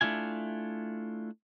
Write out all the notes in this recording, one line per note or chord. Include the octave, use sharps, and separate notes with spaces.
A3 D4 E4 F4 G#5